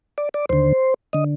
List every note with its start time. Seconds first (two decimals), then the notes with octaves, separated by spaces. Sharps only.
0.18 D5
0.34 D5
0.49 D#2 D3 C5
1.13 D3 D#5